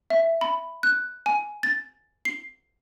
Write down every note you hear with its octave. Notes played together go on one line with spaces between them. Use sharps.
E5
B5
F#6
G#5
A6
C7